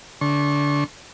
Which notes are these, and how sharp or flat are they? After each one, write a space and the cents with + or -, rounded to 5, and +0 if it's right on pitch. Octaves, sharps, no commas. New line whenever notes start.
D3 -25 C#6 -40